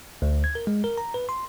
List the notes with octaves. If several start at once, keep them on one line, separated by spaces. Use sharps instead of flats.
D2
G#6
A#4
G#3
A#4
A#5
B4
C6